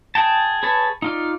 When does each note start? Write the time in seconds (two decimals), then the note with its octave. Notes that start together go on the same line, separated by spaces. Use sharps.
0.15 G#4 G5 A5
0.63 G#4 B4 C#5 A5
1.02 D#4 F4 D5